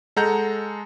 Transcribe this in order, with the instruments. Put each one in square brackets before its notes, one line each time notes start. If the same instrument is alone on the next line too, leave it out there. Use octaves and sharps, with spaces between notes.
[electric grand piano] G#3 A4 F#5 A#5 G6